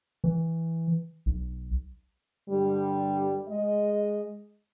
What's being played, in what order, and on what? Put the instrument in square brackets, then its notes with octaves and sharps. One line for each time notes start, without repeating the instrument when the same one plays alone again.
[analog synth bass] E3
B1
[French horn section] G2 D3 G3
G#3 D#5